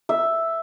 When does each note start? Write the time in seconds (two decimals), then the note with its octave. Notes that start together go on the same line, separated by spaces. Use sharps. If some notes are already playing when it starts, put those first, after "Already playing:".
0.09 E5